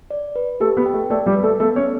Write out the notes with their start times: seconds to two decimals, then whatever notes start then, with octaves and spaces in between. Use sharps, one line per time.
0.10 D5
0.36 B4
0.60 A3 G4 A4
0.77 B3 B4
0.86 G5
0.94 A3 A4
1.10 A3 A4 D5
1.26 G3 G4
1.35 B4
1.43 A3 A4
1.60 A3 B3 A4
1.76 C#4 C#5